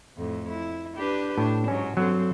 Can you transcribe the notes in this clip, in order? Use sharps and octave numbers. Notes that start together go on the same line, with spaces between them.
F2 A2
E4
D4 G4 B4
A2 D4
G#2 F#3 C#4
G2 F#3 C4 A4